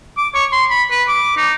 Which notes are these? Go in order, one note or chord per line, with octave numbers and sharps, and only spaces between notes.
D6
C#5
C6
B5
B4
D6
D#4